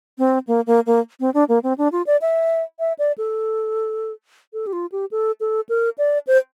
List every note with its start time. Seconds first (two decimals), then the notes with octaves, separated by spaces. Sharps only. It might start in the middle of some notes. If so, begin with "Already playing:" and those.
0.18 C4
0.47 A#3
0.67 A#3
0.86 A#3
1.20 C4
1.34 D4
1.49 A#3
1.63 C4
1.78 D4
1.92 F4
2.07 D5
2.21 E5
2.80 E5
2.99 D5
3.18 A4
4.53 A4
4.67 G4
4.73 F4
4.92 G4
5.11 A4
5.40 A4
5.69 A#4
5.98 D5
6.27 C5